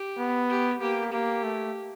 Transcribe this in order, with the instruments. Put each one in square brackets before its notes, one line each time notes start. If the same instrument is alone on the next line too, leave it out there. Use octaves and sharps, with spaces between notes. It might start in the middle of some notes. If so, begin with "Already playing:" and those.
Already playing: [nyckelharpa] G4
[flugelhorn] B3
[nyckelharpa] G4
[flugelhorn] A#3 [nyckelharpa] G4
[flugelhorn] A#3 [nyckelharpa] G4
[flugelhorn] A3